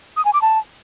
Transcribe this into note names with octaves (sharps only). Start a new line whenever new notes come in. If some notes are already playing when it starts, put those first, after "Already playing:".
D#6
G#5
D6
A5